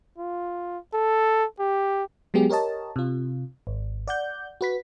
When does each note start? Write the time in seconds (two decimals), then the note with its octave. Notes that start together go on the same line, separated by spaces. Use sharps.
0.18 F4
0.94 A4
1.59 G4
2.34 F#3 G#3 B3 G4 G#4
2.50 G4 A#4 C#5 D#5 A5
2.96 C3 F4
3.67 G#1
4.08 D5 F#5 G6
4.61 F#4 B4 B6